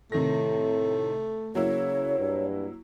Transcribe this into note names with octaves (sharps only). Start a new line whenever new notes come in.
A2 C3 D#3 A3 A#6
C#3 F#3 A#3 E4 C#5
G2